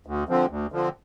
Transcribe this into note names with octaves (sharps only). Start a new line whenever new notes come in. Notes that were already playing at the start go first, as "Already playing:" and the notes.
D2
D3 F3 C4
D2
D3 F3 C4